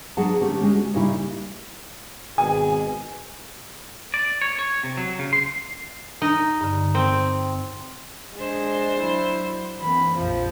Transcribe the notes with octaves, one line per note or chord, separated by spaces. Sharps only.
F#3 D4 G#4 B4 F#5 A5
D3 A3 C#4 G4
G#3 C#4
F#4
A#2 C#3 G3 D#4 E4
G#1 B2 G#4 G#5
D5
C#5
C#5
C3
F#3
C#3
C6
D#4
G2 D3
C4
G#3 D4 C5
F#3 E4
E3 A#3 C4 B5
A#1 F2 F3